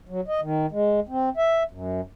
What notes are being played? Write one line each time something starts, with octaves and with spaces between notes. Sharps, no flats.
F#3
D#5
D#3
G#3
C4
E5
F#2